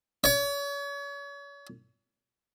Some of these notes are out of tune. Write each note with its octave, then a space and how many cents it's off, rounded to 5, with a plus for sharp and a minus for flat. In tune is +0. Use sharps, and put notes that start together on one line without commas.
C#5 +35